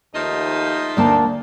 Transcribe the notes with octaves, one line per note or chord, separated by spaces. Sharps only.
D#2 F3 A3 D#4
D2 A#3 D4 A5